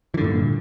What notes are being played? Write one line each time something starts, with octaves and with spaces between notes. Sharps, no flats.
G2 A#2 D3 E3